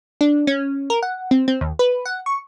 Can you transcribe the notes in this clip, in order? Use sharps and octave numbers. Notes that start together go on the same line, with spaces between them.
D4
C#4
A#4
F#5
C4
C4
D#2
B4
F#5
C#6